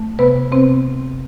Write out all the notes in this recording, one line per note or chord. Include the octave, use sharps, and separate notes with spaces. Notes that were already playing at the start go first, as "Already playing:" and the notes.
Already playing: A3
C3 B3 B4
C3 C4 C5